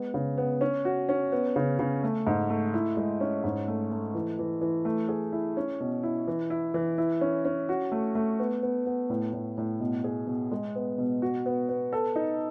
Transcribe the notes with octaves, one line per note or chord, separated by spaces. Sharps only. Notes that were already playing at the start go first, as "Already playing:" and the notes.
Already playing: G#3 B3
C#3
B3
C#4
F#4
C#4
B3
C#3
C#3
A3
G#2
A3
E4
G#3
C#4
G#2
A3
A3
E3
E3
E3
A3
G#4
E4
C#4
B2
E4
E3
E4
E3
E4
C#4
C#4
F#4
A3
A3
B3
B3
B3
A2
A2
A2
B2
G#4
B2
G#3
B3
B2
F#4
B3
B3
A4
D#4